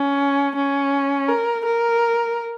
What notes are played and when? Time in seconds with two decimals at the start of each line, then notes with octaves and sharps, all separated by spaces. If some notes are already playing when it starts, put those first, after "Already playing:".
Already playing: C#4
0.56 C#4
1.29 A#4
1.65 A#4